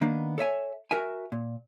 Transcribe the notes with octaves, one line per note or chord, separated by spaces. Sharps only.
D#3 A#3 B3 D4
A4 C#5 E5 G#5
F#4 A#4 E5 G#5
A#2